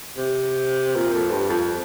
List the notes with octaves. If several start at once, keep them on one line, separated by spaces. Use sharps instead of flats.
C3
A#2
F2
G2
F2